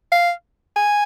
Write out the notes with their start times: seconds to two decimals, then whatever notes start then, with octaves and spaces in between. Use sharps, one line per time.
0.12 F5
0.76 G#5